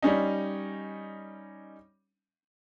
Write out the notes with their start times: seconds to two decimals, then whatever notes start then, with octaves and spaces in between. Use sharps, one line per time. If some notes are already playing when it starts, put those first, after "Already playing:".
0.02 G3 C#4 D#4